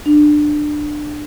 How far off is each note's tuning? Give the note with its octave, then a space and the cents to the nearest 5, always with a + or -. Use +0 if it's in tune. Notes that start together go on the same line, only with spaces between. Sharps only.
D4 +20